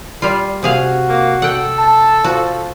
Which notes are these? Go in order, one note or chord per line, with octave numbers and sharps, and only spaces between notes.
G3 F4
C3 F#4 G#4 F5
A#3
A4 F#5 G5
A5
F3 F#4